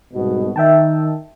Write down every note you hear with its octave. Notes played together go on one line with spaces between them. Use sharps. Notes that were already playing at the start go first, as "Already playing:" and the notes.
C2 G#2 B2
D#3 E5 G5 A5